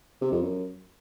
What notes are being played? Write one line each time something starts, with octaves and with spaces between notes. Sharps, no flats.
C3
F2
F#2